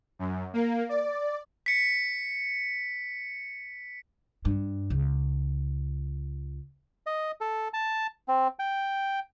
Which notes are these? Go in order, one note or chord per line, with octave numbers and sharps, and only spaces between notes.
F#2
A#3
D5
B6 C#7
G2
C#2
D#5
A4
A5
C4
G5